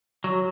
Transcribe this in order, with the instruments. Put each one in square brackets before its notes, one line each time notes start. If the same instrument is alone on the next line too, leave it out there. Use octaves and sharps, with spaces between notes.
[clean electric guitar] F#3